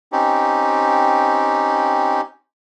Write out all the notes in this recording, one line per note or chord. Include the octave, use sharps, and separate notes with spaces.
C4 C#4 D#4 G4